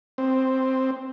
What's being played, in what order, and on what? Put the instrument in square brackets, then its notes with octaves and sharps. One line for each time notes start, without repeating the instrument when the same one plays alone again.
[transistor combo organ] C4